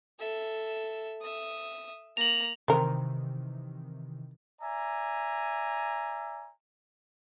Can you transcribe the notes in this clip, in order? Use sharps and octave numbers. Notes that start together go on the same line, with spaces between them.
A4 E5
E5 D#6
A#3 A#5 F7 F#7
C3 D#3 E3 C4 A#4
D5 E5 G#5 A#5